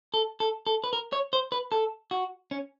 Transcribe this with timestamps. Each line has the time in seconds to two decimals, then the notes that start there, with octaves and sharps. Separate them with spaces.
0.14 A4
0.40 A4
0.67 A4
0.84 B4
0.93 A#4
1.13 C#5
1.33 C5
1.52 B4
1.72 A4
2.11 F#4
2.51 C#4